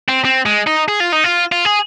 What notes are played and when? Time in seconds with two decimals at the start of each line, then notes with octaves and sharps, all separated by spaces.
0.09 C4
0.25 C4
0.46 G#3
0.67 D#4
0.88 G#4
1.00 F4
1.12 D#4
1.24 F4
1.52 F4
1.65 G#4